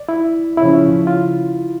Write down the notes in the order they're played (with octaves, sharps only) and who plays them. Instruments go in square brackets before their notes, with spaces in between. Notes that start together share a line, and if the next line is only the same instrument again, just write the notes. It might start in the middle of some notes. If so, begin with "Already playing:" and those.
Already playing: [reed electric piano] D5
E4
[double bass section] C#3 F3 C#4 [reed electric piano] E4
[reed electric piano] F4